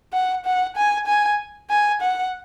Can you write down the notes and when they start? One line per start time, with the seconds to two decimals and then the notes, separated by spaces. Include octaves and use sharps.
0.13 F#5
0.45 F#5
0.76 G#5
1.06 G#5
1.70 G#5
2.01 F#5